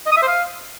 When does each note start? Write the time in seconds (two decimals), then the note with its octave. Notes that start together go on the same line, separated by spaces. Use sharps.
0.06 D#5
0.11 D#6
0.17 E5
0.22 C5
0.28 F5